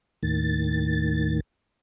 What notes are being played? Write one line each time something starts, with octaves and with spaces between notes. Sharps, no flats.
D#2 A2 D#3 A6